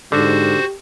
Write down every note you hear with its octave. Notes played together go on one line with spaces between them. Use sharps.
G#2 D3 F#4 G4 C5